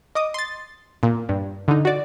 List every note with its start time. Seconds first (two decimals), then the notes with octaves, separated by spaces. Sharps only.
0.15 D#5 D6 D#6
0.34 C6 A6
1.03 A#2
1.29 G2
1.68 D3 D#4
1.85 F#4 D5